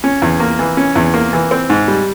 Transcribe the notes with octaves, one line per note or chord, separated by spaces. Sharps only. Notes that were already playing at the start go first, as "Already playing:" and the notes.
C#4
E2
A#3
E3
C#4
E2
A#3
E3
C4
G#2
G3